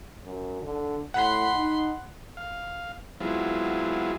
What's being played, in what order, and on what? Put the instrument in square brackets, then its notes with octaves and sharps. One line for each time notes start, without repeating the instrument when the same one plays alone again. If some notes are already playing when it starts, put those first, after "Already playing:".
[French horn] F#2
D3
[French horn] A2 [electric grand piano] F#5 [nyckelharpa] B5 C6
[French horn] D#4
[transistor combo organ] F5
F#3 G#3 B3 C4 E4 F4